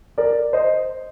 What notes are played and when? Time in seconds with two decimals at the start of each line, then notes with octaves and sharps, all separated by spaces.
0.18 A#4 D5
0.53 C5 D#5